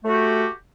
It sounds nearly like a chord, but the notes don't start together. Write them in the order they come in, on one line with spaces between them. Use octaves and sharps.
A3 F#4 G4